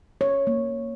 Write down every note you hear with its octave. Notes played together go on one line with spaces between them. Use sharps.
C#5
A#3